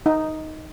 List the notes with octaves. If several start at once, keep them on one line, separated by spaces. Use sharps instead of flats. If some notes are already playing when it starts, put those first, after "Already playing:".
D#4